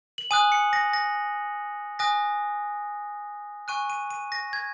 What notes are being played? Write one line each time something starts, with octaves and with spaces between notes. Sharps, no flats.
F#7
G#5 D#6 F#6 D#7
C#7
A#6
A#6
G#5 D#6 F#6 A#6
G#5 C#6 F#6 D#7
D#7
D#7
A#6
G#6